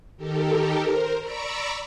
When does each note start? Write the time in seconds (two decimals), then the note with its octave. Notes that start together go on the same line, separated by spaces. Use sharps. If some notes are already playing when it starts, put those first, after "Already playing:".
0.17 D#3 G4 A4 A#4
0.83 A#4 C5
1.19 D5 A#5 B5 C#6 D6 E6